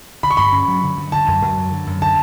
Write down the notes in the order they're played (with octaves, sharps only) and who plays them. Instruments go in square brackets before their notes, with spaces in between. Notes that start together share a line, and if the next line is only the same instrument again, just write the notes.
[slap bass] D3 [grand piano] B5
[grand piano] C#6
[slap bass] G2 [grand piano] B5
[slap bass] C#4
F#3
D3
G2
[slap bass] D3 [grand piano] A5
[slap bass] F#2
F#2
F#3
D3
F#2
[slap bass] D3 [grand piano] A5